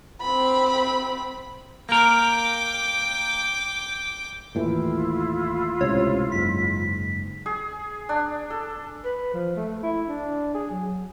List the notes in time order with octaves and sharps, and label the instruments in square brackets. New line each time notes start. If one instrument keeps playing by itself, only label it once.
[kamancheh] C4 B5
[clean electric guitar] A#3 A#4 [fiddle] G5 D6
[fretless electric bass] D#2 A2 E3 [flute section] E4 F4
[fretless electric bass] C#2 A2 C3 [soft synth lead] C#5
[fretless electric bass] F#1 G#2 [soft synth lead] B6
[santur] G#4
D4
A4
[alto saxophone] B4
F3
A3
E4
D4
G#4
F#3